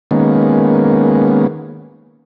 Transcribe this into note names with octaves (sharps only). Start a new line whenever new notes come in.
D#3 G#3 A#3 B3 C#4